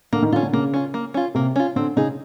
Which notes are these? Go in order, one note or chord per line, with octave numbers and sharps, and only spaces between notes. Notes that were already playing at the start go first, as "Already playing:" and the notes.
D3 A#3
D#3
D3 C#4 F4
D3
C#3 A#3
C#4 F4
A#3
C#4 F4
C3 A#3
C#4 F4
D3 C4
C#3 D#4 G#4